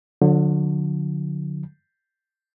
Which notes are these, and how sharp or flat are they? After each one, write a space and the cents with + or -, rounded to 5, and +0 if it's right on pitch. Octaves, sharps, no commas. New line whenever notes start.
D3 +0 F#3 -45